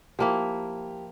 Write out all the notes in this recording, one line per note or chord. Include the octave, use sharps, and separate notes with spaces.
F3 A#3 E4 G4